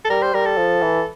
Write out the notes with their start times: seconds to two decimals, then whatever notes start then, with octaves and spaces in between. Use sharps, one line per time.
0.05 A4
0.10 G3 A#4
0.22 C5
0.34 G3 A#4
0.45 A4
0.58 F3
0.82 E3